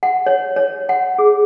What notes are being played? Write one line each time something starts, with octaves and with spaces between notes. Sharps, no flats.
F#5
C#5
C#5
F#5
G#4